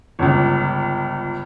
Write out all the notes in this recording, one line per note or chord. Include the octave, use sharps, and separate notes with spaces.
G1 C#2